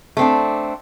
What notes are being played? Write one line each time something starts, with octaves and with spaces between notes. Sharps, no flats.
A3 C4 D4